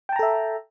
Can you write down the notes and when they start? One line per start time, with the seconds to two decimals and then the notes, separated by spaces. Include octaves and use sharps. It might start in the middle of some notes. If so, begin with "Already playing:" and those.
0.09 G5
0.12 A5
0.16 A#5
0.19 A4
0.23 E5